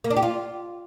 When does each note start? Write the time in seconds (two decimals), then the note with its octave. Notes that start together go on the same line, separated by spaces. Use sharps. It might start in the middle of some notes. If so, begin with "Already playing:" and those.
0.04 A#3
0.10 D4
0.16 G4
0.23 F4